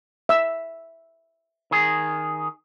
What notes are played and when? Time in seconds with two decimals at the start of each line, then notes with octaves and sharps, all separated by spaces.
0.29 E5 E6
1.71 D#3 G#4